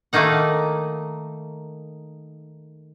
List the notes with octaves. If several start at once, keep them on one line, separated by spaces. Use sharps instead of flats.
D#3 A3 A#3 D#4 F#5